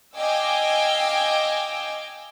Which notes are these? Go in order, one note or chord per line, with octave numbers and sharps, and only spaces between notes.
D#5 F5 G5 G#5 D6 E6